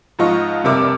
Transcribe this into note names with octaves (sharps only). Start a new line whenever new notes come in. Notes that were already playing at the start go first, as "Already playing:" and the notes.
G#2 F3 F4 D#5 C#6
F1 G2 C3 A#4 E5 D6